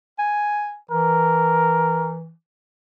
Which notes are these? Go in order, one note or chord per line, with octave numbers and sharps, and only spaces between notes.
G#5
E3 A#4